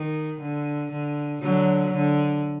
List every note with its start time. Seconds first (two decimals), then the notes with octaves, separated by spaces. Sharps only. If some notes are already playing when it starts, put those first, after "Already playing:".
Already playing: D#3
0.41 D3
0.91 D3
1.42 D3 F#3
1.93 D3